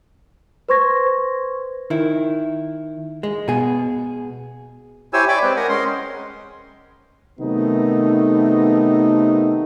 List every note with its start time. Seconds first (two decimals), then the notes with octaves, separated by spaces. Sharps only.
0.69 B4 C5 C6 C#6 G#6 A#6
1.90 D#3 E4
3.23 G#3
3.48 B2 G#4
5.13 E4 G4 C5 C#5 G#5 E6
5.28 C#5 D5 G5 G#5 B5 D6
5.43 G#3 C4 B4 C5
5.56 A#4 F#5 G#5
5.69 G#3 C#4 C6
7.40 C3 D#3 F#3 A3 B3 D#4